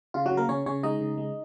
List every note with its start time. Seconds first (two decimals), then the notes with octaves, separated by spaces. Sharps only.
0.14 C#3 F4
0.26 F#3 F#4
0.32 C#3
0.37 A#3 A#4
0.49 C#3 C#4 C#5
0.66 C#3 C#4 C#5
0.83 G#3 D#4 D#5
1.01 C#3
1.18 G#3